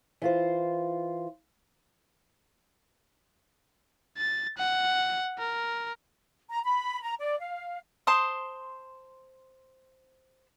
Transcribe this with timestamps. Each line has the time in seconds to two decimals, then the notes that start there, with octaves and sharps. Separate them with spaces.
0.22 E3 F4 C5
4.18 A6
4.58 F#5
5.38 A#4
6.50 A#5
6.64 B5
7.02 A#5
7.18 D5
7.39 F5
8.07 C5 A5 C6 D#6